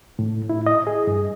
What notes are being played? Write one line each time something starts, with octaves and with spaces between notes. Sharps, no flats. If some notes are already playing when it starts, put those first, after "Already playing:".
A2
E4
D#5
G#4
G2